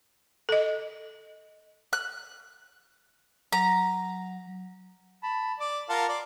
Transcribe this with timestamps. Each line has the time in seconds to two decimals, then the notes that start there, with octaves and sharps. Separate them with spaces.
0.49 A4 D#5
1.93 F#6
3.53 F#3 A#5
5.23 A5 B5
5.60 D5 D6
5.89 F4 A#4 F#5 A5 A#5 C6
6.09 D5 C6